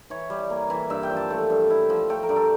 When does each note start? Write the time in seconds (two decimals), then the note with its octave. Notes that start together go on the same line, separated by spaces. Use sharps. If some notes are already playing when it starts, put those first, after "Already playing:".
0.10 E3 C#5
0.30 G3
0.50 A#3
0.70 E3
0.90 G2 E5
1.03 G5
1.10 F3
1.17 A5
1.30 A3
1.50 G2
1.70 E4
1.90 F3
2.09 A3 G5
2.23 A#4
2.29 G2
2.36 A4